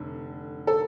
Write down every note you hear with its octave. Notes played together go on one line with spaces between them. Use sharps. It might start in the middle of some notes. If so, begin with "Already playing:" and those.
Already playing: F1 D3
A4